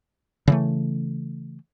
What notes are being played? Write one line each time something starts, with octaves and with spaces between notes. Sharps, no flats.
C#3 E3 A3